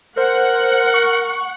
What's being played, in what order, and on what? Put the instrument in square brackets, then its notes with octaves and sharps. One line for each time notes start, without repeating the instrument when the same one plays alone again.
[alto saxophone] A#4 [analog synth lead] C5 [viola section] F#5
[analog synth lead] C#6